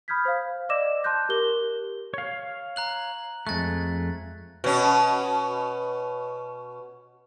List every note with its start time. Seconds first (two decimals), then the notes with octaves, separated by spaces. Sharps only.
0.08 B5 D#6 F6 G6 G#6 B6
0.25 C5 F5
0.69 D5 D#5 D6 E6 A#6 E7
1.04 A5 C6 D6 F#6 G6 A#6
1.29 G4 A#4 G7
2.14 C#5 F5
2.76 A#5 F#6 F#7
3.47 F2 G#3 A3 F#6 A6
4.64 B2 C#4